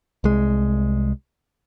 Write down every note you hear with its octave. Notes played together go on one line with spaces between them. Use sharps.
C2 G#3